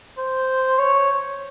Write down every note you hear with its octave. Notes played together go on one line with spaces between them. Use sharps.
C5
C#5